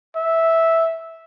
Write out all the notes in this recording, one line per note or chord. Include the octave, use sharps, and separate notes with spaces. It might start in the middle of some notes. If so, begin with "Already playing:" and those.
E5